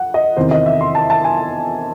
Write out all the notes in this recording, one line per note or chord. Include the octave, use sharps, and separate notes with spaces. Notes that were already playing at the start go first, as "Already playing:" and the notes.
Already playing: F#5
D#5
E2 C3 D#3 C5
D#5
E5
C6
A5
A5
G#5